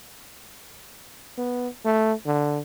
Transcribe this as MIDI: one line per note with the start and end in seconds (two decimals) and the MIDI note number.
1.38 1.68 59
1.85 2.13 57
2.26 2.60 50